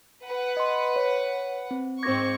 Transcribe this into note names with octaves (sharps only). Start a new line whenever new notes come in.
B4 F#5
D#5 C6
C#5
C4
G#2 C4 C#6 D6 G#6 A#6